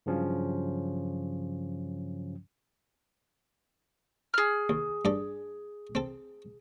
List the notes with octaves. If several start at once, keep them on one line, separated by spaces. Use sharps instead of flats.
G2 C#3 F3 F#3 C#4
G#4 F6
D#2
G2 A4 D5
C4 A4